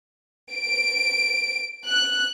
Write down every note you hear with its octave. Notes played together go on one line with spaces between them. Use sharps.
D7
F#6